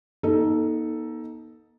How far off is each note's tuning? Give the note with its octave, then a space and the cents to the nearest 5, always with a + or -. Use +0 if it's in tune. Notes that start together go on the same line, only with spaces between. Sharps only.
B3 -45 D#4 +15 A4 +0